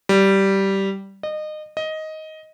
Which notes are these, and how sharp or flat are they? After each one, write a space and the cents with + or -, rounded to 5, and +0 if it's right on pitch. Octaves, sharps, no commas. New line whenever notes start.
G3 -10
D#5 -25
D#5 +10